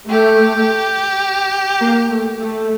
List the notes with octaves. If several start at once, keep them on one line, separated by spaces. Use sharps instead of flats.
A3 G4
A#3
A3
A3